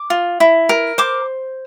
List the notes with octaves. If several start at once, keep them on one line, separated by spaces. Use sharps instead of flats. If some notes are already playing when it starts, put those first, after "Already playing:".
Already playing: D6
F4
E4
A#4
C5 D6